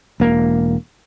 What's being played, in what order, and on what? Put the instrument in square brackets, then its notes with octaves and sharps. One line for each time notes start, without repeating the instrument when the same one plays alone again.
[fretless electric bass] E1 A#3